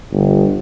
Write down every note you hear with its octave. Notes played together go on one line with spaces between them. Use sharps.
G1